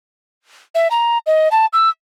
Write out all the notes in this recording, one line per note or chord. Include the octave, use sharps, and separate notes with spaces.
E5
A#5
D#5
A5
E6